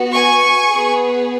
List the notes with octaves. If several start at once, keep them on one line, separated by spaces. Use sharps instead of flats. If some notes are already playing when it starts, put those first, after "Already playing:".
Already playing: B3 F#4
G#5 C#6
B3 G#4